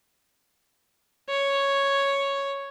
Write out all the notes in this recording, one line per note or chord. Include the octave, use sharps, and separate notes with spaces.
C#5